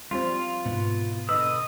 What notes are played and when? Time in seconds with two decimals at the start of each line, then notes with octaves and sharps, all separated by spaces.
0.11 F3 G3 C4 F4
0.66 G#2 B2 B3
1.29 B2 D3 B4 D#5 D#6 E6